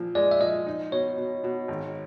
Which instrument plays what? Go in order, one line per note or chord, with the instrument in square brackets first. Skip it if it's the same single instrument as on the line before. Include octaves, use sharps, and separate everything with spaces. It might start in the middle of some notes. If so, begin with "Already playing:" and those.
Already playing: [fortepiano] A#2 F3
[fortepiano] G#3 [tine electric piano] D5
[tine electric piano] E5
[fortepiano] F3 [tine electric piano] D#5
[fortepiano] D#4
[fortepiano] B2 [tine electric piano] C#5
[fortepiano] B2
B2
G#1